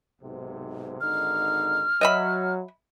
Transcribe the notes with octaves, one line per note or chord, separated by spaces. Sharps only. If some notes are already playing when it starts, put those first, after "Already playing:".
B1 G#2 C3
G#1 D3 D#4 F6
F#3 D#5 E5 B5